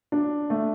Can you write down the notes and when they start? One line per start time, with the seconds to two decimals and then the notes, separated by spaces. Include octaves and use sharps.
0.12 D4
0.50 A3